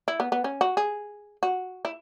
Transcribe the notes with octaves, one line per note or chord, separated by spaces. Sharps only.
E4
B3
B3
C#4
F#4
G#4
F#4
E4